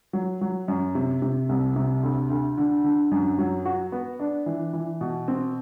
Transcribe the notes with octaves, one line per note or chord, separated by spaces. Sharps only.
F#3
F#3
F#2
C3
C3
C2
C3
D2
D2
D3
D3
F#2
F#3
F#4
B3
D4
E3
E3
B2
C4